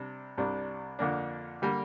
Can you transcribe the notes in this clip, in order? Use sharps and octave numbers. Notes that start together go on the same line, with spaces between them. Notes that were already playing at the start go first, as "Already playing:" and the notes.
Already playing: C3 G3 D4
C2 C3 G3 D4
F2 D3 A#3 D4
D3 G3 A#3